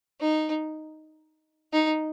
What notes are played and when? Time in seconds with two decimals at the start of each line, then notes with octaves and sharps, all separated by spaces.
0.20 D#4
1.73 D#4